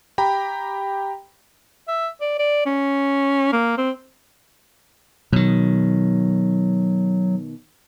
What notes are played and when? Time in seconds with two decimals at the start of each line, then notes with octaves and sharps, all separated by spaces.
0.18 G4 G5 A#5 B5
1.88 E5
2.21 D5
2.39 D5
2.66 C#4
3.52 A#3
3.78 C4
5.33 B2 D#3 F#3